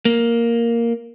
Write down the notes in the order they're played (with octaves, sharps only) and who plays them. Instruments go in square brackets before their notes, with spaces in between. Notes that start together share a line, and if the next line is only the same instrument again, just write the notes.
[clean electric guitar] A#3